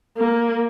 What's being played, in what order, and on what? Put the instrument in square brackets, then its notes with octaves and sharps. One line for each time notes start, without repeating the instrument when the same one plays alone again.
[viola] A#3